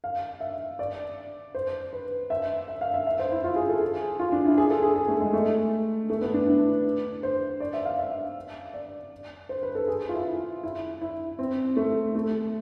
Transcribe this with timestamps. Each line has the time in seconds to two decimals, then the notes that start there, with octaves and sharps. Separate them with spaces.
0.04 F5
0.40 E5
0.79 D5
1.55 C5
1.93 B4
2.30 E5
2.68 E5
2.81 F5
2.94 E5
3.07 E5
3.19 C5
3.32 E4
3.44 F4
3.56 G#4
3.69 A4
3.81 G#4
4.19 F4
4.32 D4
4.46 E4
4.58 G#4
4.70 A4
4.82 G#4
4.96 G#4
5.08 A3
5.21 G#3
5.33 A3
6.10 A3
6.21 B3
6.34 D4
6.47 E4
7.23 C5
7.60 D5
7.73 E5
7.85 F5
7.99 E5
8.73 D5
9.49 C5
9.63 B4
9.75 A4
9.88 G#4
10.09 F4
10.13 E4
10.63 E4
11.01 E4
11.39 C4
11.77 A3
12.15 A3